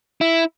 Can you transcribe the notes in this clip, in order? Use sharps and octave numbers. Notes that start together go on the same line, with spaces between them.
E4